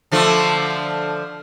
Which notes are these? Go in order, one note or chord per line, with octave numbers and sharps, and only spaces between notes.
D3 F3 A3